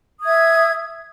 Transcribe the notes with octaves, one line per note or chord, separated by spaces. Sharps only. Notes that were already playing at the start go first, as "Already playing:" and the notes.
E5 D#6 G#6